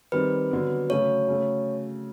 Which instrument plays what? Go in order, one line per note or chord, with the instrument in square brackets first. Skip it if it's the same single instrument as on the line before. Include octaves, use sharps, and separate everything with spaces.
[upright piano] D#3 G3 C4 [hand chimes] B4
[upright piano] D3 F#3 B3
[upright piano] C#3 F#3 A3 [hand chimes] C#5
[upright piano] C#3 F#3 A3